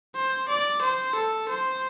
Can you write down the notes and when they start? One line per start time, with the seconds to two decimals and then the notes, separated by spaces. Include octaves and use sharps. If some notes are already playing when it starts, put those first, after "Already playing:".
0.15 C5
0.49 D5
0.82 C5
1.15 A4
1.49 C5